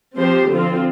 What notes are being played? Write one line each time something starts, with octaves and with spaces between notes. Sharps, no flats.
F3 C4 G4 C5
D3 F3 C4 F4